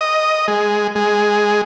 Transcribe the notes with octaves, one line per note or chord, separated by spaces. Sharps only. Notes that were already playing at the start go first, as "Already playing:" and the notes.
D#5
G#3
G#3